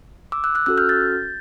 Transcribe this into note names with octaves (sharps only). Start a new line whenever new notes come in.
D6 E6
E6 F#6
E6 F#6
C#4 F#4 A4 E6 F#6
F6 G6
G6 A6